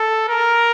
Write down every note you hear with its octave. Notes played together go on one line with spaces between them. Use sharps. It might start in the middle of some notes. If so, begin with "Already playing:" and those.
Already playing: A4
A#4